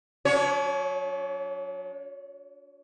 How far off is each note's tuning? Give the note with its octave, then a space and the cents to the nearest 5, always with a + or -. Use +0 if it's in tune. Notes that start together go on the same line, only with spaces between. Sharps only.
F#3 -35 D4 -45 C#5 +0